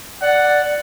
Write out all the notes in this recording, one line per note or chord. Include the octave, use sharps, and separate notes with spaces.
D5 F#5